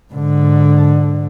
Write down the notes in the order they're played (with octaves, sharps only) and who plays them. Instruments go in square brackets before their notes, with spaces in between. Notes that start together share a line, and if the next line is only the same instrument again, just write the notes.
[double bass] G#2 D3